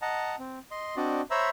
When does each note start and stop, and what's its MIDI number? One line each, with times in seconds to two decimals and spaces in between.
0.02 0.36 75
0.02 0.36 78
0.02 0.36 81
0.02 0.36 82
0.39 0.59 60
0.71 0.96 75
0.71 0.96 84
0.97 1.21 60
0.97 1.21 62
0.97 1.21 66
0.97 1.21 74
0.97 1.21 75
1.31 1.50 72
1.31 1.50 73
1.31 1.50 76
1.31 1.50 82
1.31 1.50 83
1.31 1.50 88